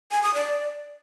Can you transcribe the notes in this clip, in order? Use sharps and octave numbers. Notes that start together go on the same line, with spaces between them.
G#5
D#6
D5